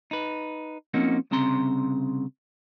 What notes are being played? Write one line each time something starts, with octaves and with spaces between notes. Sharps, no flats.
D#4 B4
F3 A#3 C4 C#4 D#4 F#4
C2 C#3 C4 A#5 C6